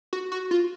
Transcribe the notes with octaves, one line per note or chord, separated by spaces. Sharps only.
F#4
F#4
F4